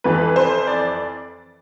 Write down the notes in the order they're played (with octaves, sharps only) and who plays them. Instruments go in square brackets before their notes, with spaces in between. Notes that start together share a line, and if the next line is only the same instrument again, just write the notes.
[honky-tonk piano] F2 E3 B4
C5
D5